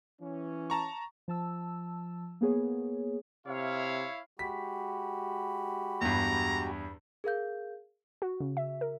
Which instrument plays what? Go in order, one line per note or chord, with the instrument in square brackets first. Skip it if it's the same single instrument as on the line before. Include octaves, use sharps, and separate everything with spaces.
[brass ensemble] E3 C#4
[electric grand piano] A5 A#5 C#6
[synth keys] F3 A5 E6
A#3 B3 G#4 C#5
[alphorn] C3 [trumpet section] E4 C#5 F5
[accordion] G#3 F#4 G4 [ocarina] B5 [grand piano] B6
[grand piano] E2 G2 [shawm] A#5
[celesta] G#4 A#4 F5 G6
[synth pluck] F#4
C#3
E5
A#4